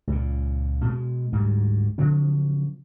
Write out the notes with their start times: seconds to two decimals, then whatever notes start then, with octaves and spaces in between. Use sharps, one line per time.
0.07 C#2 A#2
0.84 B2 G#3
1.32 D2 G#2 G3
1.98 C#3 F3 F#3 C4